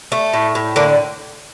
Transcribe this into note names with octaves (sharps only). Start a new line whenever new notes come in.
A3
A2
A2
D3 A#3 D4